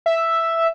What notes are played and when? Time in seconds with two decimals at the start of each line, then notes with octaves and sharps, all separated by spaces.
0.06 E5